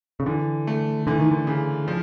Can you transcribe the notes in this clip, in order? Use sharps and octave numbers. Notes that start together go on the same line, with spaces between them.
C#3
D3 E3
A3
D3 E3
D#3
D3
C#3
F3